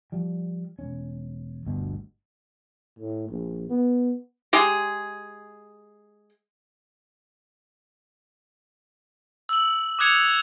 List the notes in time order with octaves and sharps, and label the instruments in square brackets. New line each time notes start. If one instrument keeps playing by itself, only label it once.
[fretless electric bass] F3 G3
E1 C#4
G1 D2 B2
[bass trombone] A2
A#1
B3
[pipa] G#3 G4 G#4
[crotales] E6 F#7
D6 D#6 F#6 G#6 C#7 F7